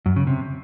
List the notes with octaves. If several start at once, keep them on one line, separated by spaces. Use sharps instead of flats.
F#2
C#3
C3